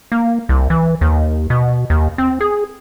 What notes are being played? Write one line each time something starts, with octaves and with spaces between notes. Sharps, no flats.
A#3
C2
E3
D#2
B2
D#2
C4
G#4